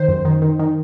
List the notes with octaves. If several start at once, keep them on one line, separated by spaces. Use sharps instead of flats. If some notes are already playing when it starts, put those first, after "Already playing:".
Already playing: D#3 C5
F#2
D#3
D#3
D#3